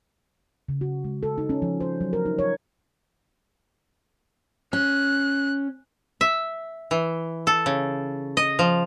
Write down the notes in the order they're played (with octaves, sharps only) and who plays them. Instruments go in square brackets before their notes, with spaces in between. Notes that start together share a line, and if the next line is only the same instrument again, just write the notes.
[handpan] C#3
F#4
G#3
A4
D#4
C#4
F3
C5
F#3
A#4
D#4
C#5
[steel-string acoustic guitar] C#4 [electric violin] F#6
[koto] E5
E3
A4
C#3
D#5
F3